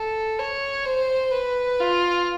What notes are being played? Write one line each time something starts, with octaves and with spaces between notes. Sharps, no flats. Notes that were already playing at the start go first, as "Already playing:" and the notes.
Already playing: A4
C#5
C5
B4
F4